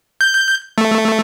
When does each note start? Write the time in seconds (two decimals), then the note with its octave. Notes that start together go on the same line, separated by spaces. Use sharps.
0.21 G6
0.78 A3